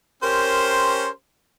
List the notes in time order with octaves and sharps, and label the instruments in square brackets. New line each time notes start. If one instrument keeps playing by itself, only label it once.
[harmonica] C#4 C5 [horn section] G4 A#4 C6